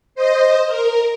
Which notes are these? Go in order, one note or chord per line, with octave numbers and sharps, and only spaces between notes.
C5 D#5
A#4